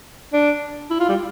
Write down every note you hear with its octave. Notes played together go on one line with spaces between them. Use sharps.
D4
E4
F4
G3